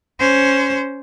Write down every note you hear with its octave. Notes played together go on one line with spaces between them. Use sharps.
C#4 C5